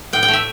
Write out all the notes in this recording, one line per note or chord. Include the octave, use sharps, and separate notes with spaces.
A2 G5
G5
A3 E5